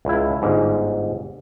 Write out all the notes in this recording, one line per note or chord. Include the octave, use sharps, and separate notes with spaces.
C#2 E4
G1 G#2